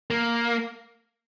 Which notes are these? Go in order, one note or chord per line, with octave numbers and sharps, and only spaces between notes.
A#3